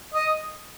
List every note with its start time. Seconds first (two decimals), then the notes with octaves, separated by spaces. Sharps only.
0.14 D#5